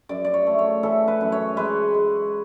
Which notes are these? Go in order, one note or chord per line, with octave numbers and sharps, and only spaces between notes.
F#2 D5
D5
C#5
A3
C#5
E3 A4
B4
F#2
C#5
G#3 B4
G#3